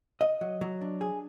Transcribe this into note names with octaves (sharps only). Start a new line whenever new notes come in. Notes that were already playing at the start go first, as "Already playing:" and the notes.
D#5
F#3
F#3
D4
G#4